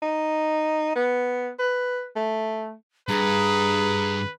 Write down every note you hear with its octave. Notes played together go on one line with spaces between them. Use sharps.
D#4
B3
B4
A3
G2 G#4 B4 A#5